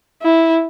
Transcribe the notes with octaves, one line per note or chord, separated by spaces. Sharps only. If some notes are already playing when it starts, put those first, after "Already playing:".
E4